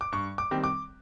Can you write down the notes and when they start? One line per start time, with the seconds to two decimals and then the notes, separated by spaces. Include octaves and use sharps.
0.01 D6
0.12 G2 C#6
0.38 D6
0.51 D#3 G3 C4
0.64 D6